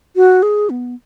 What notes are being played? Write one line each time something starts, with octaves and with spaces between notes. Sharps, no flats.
F#4
G#4
B3